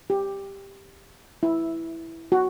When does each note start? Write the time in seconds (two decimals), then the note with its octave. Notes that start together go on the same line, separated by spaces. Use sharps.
0.10 G4
1.43 E4
2.32 F#4